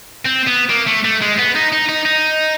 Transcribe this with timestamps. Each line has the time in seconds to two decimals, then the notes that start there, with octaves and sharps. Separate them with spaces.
0.26 C4
0.48 B3
0.70 A#3
0.87 A3
1.05 A3
1.21 G#3
1.38 B3
1.55 D#4
1.72 D#4
1.89 D#4
2.05 D#4